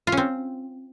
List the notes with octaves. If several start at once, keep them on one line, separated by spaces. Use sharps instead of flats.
F4
C#4
C4